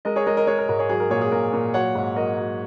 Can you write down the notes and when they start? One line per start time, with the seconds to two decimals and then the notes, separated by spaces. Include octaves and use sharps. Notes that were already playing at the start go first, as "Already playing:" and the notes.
0.05 G#3 A#4 D#5
0.16 G#4 C#5
0.27 G#3 A#4 D#5
0.37 A#4 D#5
0.47 G#3 G#4 C#5
0.58 A#4
0.69 G#2 A#4
0.79 G#4 C#5
0.89 F#3 G#4
1.00 A#4
1.10 A#2 G#4 C#5
1.21 G#4
1.32 A#2 A#4
1.53 A#2 A#4
1.74 F#3 C#5 F#5
1.95 G#2
2.16 F#3 A#4 D#5
2.38 F#3